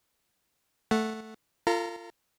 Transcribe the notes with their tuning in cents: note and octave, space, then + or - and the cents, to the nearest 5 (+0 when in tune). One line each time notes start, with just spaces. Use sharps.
A3 +0 F#5 +0
F4 -15 A4 +45 A#5 +0